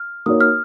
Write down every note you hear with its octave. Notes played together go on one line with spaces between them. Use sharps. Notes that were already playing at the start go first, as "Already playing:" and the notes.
Already playing: F6
A#3 D#4 F#4 A#4 C#5 D#6
F6